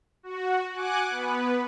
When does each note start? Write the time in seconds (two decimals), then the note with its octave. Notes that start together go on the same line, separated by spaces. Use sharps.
0.23 F#4
0.72 F#5 G#5 D6 F#6
1.10 B3 B4